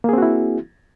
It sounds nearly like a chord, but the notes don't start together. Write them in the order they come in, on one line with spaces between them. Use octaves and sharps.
A#3 G#4 C4 F#4 E4